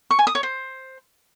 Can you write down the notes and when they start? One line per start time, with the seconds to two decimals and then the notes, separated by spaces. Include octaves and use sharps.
0.11 C#6
0.19 G#5
0.27 D#6
0.35 C#5
0.43 C5